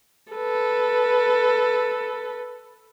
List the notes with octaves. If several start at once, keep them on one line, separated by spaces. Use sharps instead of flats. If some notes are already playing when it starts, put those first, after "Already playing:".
A4 B4